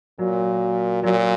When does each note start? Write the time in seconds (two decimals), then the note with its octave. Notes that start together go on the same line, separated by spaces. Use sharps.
0.19 A#2 F#3
1.03 A#2 F#3